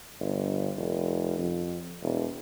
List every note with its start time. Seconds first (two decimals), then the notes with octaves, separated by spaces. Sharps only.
0.20 G1
0.77 F1
1.38 F2
2.02 E1